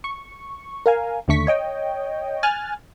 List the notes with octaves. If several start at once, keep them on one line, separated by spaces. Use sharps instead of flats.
C#6
A#4 F5 G#5
D#2 D3 A3 C#6 B6
C#5 D#5 G5
G#5 F6 F#6 A6